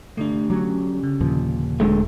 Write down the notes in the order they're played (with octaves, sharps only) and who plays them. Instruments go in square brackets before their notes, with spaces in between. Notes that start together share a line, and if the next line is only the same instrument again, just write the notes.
[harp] G1 [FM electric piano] A3 D4
[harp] D3 C#4 [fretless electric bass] F#3
[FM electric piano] C#3
[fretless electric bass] D#2 A#2 F3
[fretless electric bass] D#1 [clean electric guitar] D3 G#3 A3